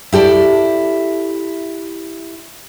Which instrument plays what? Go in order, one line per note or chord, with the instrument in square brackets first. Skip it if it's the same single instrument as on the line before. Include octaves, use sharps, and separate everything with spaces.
[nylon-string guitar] E4 G4 A4 D5